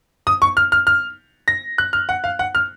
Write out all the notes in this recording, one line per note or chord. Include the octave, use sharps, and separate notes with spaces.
D#6
C#6
F6
F6
F6
A#6
F#6
F6
F#5
F5
F#5
F6